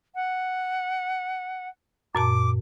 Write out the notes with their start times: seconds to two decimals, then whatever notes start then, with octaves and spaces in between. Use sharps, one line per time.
0.15 F#5
2.15 F#2 A#2 A5 D6